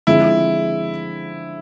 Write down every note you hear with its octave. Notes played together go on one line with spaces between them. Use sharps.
D3 F3 G#3 C4 E4